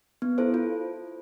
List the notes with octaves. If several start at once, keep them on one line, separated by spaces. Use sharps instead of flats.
B3
E4 A4 C5
F4